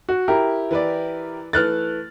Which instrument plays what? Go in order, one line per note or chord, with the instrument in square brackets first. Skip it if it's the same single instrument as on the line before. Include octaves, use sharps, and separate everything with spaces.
[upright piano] F#4
E4 G4 A#4
[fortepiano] E3 B4 D5
[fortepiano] E3 A3 [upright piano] F6 F#6 A6